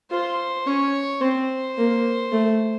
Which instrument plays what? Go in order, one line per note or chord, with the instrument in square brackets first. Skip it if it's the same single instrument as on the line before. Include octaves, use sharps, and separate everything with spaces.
[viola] F4 [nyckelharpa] C5
[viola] C#4 [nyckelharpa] C#5
[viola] C4 [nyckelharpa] C5
[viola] A#3
A3